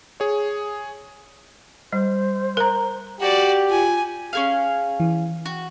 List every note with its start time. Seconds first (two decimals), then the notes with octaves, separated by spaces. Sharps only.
0.20 G#4 C#5
1.93 G3 C5
2.57 A#4 A#5
3.20 F#4 G4 D5
3.69 F4 G#5
4.33 C#4 G#4 F5
5.00 E3
5.45 F#4